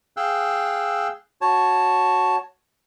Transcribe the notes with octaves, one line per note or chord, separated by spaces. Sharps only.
G#4 F5 G5 E6 F#6
F#4 C#5 A5